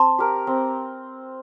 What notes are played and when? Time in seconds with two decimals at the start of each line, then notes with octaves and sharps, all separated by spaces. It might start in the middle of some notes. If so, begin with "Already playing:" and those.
Already playing: C4 A5 C6
0.18 G4 A#4
0.47 C4